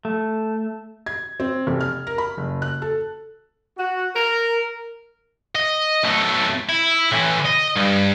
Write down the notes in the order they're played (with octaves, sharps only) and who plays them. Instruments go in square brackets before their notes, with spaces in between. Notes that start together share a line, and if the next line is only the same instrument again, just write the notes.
[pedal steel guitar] A3
[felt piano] G#6
C4
F1
F6
A#4
B5
F#1
F#6
A4
[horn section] F#4
A#4
[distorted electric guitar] D#5
B1 A3
E4
A2 E3
D#5
G2